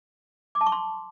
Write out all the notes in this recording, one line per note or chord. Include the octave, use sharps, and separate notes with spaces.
D6
A5
C#6
C6